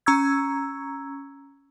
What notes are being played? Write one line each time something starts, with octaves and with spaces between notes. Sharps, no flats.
C#4 A#5 C#6 E6 G#6